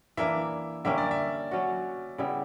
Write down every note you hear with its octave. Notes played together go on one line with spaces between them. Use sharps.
E3 A#3 D4 E5
D3 G3 A#3 C#4 E5
D5
E5
F#3 C#4 F#4
C#3 G3 B3 E4